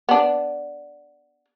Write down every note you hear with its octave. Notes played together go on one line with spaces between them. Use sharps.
B3 D4